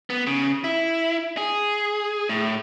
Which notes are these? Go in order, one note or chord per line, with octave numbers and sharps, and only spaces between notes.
B3
C#3
E4
G#4
A2